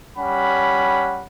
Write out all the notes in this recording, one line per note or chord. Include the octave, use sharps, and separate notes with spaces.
G3 C#4 F#5 B5